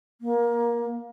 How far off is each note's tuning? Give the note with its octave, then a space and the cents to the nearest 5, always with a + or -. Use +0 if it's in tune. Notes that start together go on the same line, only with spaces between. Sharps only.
A#3 +20